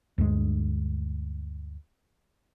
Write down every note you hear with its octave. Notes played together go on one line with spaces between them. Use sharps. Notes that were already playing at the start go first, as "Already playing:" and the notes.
D2 G2 G#3